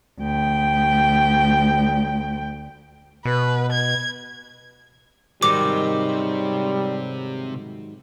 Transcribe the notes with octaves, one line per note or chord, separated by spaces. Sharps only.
D2 G5
B2 B4
G#6
G#2 C3 D#3 F#3 G3 C5 D6